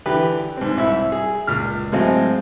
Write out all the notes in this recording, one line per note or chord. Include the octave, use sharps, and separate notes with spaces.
D3 E3 G4 B4
G#2 C4
C2 E4 E5
G#4
C#2 A#2 F6
A2 F#3 G#3 C4 D#5 F5